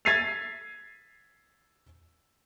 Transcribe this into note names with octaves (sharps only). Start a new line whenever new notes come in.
G#6 A6 B6 C7 D#7 F7